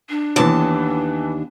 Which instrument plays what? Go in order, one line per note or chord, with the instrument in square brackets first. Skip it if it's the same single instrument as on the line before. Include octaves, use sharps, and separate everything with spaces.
[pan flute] D4
[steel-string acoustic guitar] D#2 A5 [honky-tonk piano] E3 B3